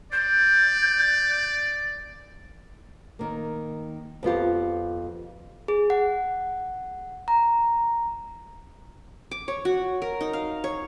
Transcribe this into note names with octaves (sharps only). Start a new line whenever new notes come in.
D5 G6
D#3 A#3
F2 B3 F4 G4
G#4
F#5
A#5
D6
C#5
F#4
A#4
D#4
F5
C#5